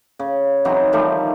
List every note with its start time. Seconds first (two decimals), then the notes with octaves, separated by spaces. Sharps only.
0.19 C#3
0.65 E3 F#3 C4 D#4
0.93 D#3 F3 G3 A3